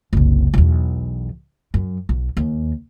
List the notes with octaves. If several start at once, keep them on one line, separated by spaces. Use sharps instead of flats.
F#1 C2
B1 E2
F#2
B1
D#2